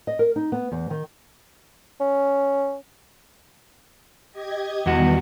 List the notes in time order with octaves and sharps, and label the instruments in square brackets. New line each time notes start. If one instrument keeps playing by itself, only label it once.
[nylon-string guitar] D#5
A#4
D#4
B3
E2
D#3
[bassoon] C#4
[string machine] G4 D#5 G#6
[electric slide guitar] E2 F#4 [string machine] D#3 G3 B3